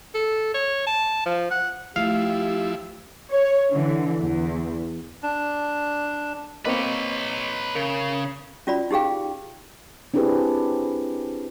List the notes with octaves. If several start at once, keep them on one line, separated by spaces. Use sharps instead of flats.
A4
C#5
A5
F3
F#5
F3 A3 E4 G4 F5
C#5
D3 E3
E2
D4
A#3 C4 B4 C#5 D#5
C#3 A#4
C#4 F4 F#4 D5 B5
D#4 G4 G#4 F5 G5
C4 D4 E4 G4 G#4 B4